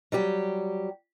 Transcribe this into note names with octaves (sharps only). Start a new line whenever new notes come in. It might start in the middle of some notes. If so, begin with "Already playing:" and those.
F#3 G3 G4